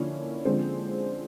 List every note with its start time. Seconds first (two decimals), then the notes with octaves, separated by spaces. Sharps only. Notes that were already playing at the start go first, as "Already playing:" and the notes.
Already playing: D3 F3 A#3 C#4 E4
0.45 D3 F3 G#3 C4